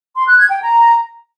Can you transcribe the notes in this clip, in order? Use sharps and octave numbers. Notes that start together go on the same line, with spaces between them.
C6
F#6
G#6
G5
A#5